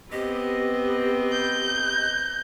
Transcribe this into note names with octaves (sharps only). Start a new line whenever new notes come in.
B3 C4 G4 D#5
G6